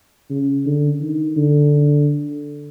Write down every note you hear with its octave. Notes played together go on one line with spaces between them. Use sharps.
C#3
D3
D#3
D3